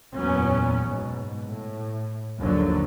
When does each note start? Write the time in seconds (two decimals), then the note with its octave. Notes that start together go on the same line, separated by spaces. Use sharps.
0.17 F#1 E2 A#2 F#3 B3 C#4
0.85 G#2 B2
1.44 A2
2.39 G1 D#2 D3 F3 F#3